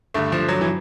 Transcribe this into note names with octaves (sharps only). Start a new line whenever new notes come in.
G2 D3 A3
F3
F#3
E3